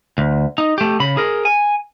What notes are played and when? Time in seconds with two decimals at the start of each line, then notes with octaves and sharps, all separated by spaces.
0.18 D2
0.58 D#4
0.78 A3 G4
1.00 C#3 B5
1.17 G#4 A#4
1.45 G#5